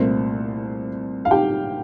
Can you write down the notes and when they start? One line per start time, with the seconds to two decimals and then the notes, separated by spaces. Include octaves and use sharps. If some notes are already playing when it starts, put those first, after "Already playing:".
Already playing: C2 A#2 A3 C4
1.25 F5
1.31 G4 G5